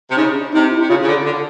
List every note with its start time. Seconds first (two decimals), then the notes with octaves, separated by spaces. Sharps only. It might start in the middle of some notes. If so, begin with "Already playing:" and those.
0.10 C3
0.16 C#3 D#4
0.35 D4
0.52 C3 D#4
0.70 E4
0.80 C3
0.88 C#3 F4
1.01 C#3
1.07 D3
1.24 D3